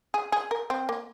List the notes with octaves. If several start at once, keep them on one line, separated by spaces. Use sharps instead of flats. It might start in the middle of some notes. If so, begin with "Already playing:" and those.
G#4
G#4
A#4
C4
A#3